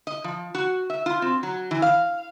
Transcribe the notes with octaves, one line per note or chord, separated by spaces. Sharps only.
D#5
F3
F#4
E5
F4
C4
F#3
E3
F5